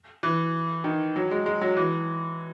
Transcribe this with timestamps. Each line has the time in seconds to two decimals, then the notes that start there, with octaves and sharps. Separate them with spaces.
0.23 E3
0.84 D#3
1.16 F#3
1.31 G#3
1.46 G#3
1.61 F#3
1.77 E3